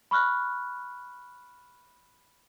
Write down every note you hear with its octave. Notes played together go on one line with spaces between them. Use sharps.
B5 C#6 F6 F#6